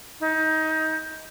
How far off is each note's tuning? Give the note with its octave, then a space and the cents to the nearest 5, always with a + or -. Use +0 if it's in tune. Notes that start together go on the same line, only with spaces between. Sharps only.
D#4 +20